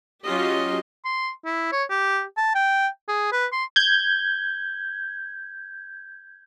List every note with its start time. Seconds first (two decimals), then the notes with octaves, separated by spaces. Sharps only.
0.23 F#3 C#4 F4 G4 D#5
1.04 C6
1.45 E4
1.72 C#5
1.90 G4
2.37 A5
2.55 G5
3.08 G#4
3.32 B4
3.52 C6
3.76 G6 G#6